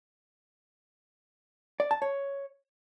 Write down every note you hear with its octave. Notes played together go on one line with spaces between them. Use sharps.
D5
A5
C#5